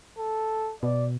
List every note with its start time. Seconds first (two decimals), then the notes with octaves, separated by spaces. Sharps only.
0.18 A4
0.83 B2 D5